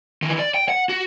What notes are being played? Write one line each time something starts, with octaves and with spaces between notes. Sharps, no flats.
D#3 E3
D5
G5
F#5
F#4